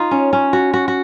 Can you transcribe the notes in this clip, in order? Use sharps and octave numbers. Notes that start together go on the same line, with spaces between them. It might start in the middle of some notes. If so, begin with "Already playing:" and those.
Already playing: D#4 F4
C#4
C#4
F#4
F#4
F#4